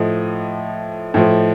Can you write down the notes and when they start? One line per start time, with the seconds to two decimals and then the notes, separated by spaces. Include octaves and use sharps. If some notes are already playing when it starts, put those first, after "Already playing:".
Already playing: A2 F3 D#5
1.14 A2 F3